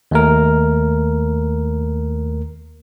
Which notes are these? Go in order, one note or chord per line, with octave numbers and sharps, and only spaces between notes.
D#2 A3 A#4